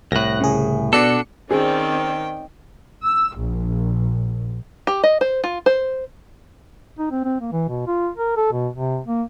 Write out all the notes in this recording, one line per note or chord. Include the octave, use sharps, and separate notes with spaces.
C2 A2 F#6 A#6
C#3 G#4
B2 D4 F#4 A4 D5 C#7
D#3 C4 C#4 G#4 D5 G5
E6
A#1
G4
D#5
C5
F4
C5
D#4
C4
C4
A#3
E3
B2
F4
A#4
A4
B2
C3
A#3